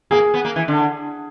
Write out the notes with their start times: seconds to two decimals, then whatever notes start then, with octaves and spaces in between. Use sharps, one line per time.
0.11 A#3 G#4
0.34 B3
0.45 A#3
0.56 E3
0.68 D3